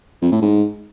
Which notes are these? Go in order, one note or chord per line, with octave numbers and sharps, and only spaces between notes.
F2
A2
G#2